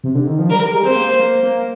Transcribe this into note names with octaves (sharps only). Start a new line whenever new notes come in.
C3
D3
D#3
F3
G3 A#4
G#3
C4 C5
A#3
A#3
A#3